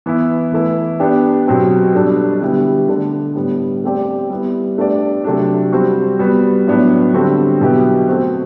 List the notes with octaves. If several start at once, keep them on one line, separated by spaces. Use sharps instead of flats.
E3 B3 E4
E3 A3 E4 B4
B3 D4 G4
B2 F#3 C4 G4
B2 G3 D4 A4
D3 G3 B3 E4 G4
D3 A3 D4 A4
A2 G3 B3
A3 C4 G4 D5
G3 B3 E4
A3 D4 G4 B4 D5
C3 F#3 A3 D4
G3 C4 F#4 C5
G3 B3 F#4
A2 F#3 B3 D4
D3 G3 C4 F#4 A4
B2 F#3 B3 E4 G4
A3 C4 F#4 C5